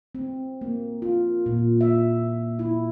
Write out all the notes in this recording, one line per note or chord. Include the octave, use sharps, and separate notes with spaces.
C4
A#3
F4
A#2
E5
E4